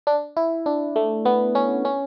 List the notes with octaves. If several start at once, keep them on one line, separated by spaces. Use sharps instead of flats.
D4
E4
D4
A3
B3
C#4
C#4